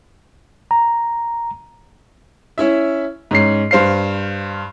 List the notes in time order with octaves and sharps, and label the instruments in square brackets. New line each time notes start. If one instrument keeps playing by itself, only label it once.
[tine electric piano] A#5
[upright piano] C#4 E4 E5
G#2 C#4 C7
G2 C5 F5 C7